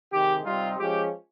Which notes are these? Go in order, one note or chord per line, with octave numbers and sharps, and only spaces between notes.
C3 D#3 G#3 G4
C3 G3 C4 D#4 F4
F3 G#3 C#4 G4